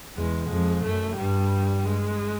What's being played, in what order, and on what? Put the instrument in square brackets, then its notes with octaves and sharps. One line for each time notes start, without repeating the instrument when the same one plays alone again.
[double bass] E2 [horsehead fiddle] G#3
[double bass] F2 [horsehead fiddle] G#3
[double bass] F#2 [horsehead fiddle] A3
[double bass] G2 [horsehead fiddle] G3
[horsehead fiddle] G#3